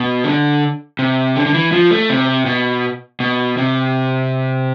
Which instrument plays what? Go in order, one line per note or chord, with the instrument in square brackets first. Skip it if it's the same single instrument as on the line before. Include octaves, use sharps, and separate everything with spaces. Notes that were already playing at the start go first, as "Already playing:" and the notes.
Already playing: [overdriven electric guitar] B2
D3
C3
D3
D3
E3
F3
A3
C3
B2
B2
C3